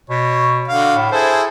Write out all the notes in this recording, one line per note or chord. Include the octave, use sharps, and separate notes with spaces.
B2 C#5
D3 F#4 F5
A2
E4 G#4 A4 C5